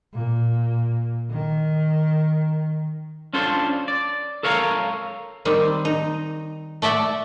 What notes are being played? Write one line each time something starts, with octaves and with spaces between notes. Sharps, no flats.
A#2
D#3
C#4 D4 F4 A4 C5
D5
A4 A#4 C#5 F5 F#5 A#5
D#3 G3 C4
D#4
A3 D5 E5 F#5